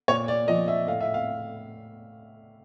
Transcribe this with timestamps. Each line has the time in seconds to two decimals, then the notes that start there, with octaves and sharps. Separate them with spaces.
0.08 A#2 C#5
0.28 D5
0.48 F3 D#5
0.68 E5
0.87 A2 F5
1.01 E5
1.14 F5